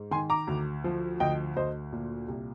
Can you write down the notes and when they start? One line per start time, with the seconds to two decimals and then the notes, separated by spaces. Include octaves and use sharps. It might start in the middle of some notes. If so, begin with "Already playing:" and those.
Already playing: G#2
0.11 D#3 G#5 C6
0.30 A#5 D6
0.47 D2
0.84 F3
1.20 D2 D#5 G5
1.56 D2 C5 D#5
1.93 A#2
2.28 C2